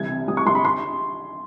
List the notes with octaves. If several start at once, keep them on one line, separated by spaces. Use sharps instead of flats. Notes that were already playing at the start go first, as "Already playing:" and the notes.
Already playing: C2 E3 G#6
C3
C2 D#6
C#6
C2 C6
B5
C6